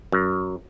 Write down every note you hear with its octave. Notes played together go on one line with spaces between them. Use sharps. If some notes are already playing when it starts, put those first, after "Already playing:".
F#2